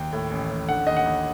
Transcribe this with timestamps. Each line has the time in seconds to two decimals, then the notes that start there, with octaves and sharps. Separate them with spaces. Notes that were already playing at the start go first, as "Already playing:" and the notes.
Already playing: D#2 G5
0.13 A2
0.31 A1
0.50 A1
0.69 D3 F#5
0.87 D#2 D#5
0.97 F#5
1.06 D#2